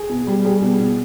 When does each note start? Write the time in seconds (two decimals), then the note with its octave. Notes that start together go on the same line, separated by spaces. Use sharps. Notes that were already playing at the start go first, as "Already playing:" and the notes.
Already playing: G#4
0.09 B2
0.27 G3
0.45 G3 G#4
0.62 B2
0.80 B2